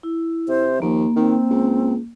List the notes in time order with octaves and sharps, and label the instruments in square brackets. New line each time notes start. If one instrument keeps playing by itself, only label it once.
[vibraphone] E4
[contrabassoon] C3 [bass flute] C5
[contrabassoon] D#2 [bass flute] F3 [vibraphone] A#3
[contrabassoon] D#3 [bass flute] C4
[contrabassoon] C#2